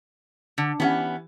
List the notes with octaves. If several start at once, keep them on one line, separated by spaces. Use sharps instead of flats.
D3
E3 B3 C#4 G4 F#5